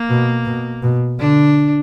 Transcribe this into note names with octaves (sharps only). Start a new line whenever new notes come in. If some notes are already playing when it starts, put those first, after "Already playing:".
Already playing: A#3
B2
B2
B2
D3 D4